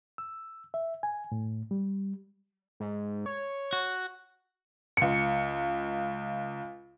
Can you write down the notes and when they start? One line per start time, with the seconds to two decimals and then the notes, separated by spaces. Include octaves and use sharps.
0.18 E6
0.74 E5
1.03 G#5
1.32 A2
1.71 G3
2.80 G#2
3.26 C#5
3.73 F#4
4.97 C#2 C#7